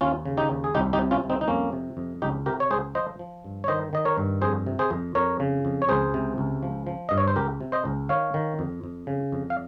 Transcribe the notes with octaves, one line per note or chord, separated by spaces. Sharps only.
D#2 C#4 F4
C#3
D#4 G4
D#2
G#4
C2 D#4 G4
D#4 G4
C3
C#4 F4
C2
C4 D#4
D#4
F2 A#3 C#4
C3
F2
C#2 D#4 G4
C3 G4 A#4
C#5
C#2 G#4 C5
F3 C5 D#5
F3
G2
C#5
D#3 C5 D#5
D#3 D#5
A#4 C#5
G2
F2 G#4 C5
C3
G#4 C5
F2
F2 A#4 C#5
C#3
F2
C#5
C#2 G#4 C5
C3
C#2
F3
F3
G2 D#5
C#5
C5
C#2 G4 A#4
C3
C5 D#5
C#2
D#3 C#5 F5
D#3
F2
F2
C#3
F2
F5